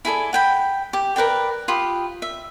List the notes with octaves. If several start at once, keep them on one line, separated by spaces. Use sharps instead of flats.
E4 G#4 A4 D5
F#5 G5 B5
G4
A#4 B4 D5 G5
F4 G4 B5 D#6
E5